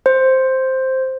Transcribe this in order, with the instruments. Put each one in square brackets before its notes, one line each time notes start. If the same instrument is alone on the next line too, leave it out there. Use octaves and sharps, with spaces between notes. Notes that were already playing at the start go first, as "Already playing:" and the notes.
[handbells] C5